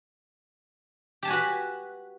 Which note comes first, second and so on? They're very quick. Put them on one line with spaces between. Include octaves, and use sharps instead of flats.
G4 A5 G#5 F#4 B4